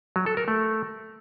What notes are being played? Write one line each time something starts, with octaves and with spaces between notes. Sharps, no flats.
F#3
A4
A#4
A3